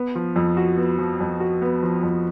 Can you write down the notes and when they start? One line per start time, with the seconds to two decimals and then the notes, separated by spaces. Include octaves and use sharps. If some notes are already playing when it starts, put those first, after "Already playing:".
Already playing: B3
0.15 F3
0.36 F2
0.57 F#4
0.78 B3
0.98 F3
1.20 F2
1.40 F#4
1.62 B3
1.83 F3
2.03 F2